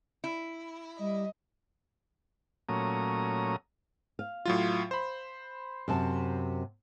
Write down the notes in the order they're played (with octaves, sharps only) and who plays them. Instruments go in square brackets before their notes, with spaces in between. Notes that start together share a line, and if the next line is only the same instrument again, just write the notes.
[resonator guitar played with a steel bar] E4
[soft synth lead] G3 [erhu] D#5
[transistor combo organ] A#2 F#3 A3 C#4 A#5 D#6
[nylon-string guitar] F5
[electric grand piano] A2 F#3 F4
C5 B5
[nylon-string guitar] F#2 C3 A5